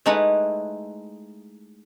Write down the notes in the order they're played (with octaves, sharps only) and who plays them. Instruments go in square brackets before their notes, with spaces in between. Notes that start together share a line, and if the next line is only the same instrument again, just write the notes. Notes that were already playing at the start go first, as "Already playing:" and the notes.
[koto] G#3 A3 D#4 E4 B4 F#5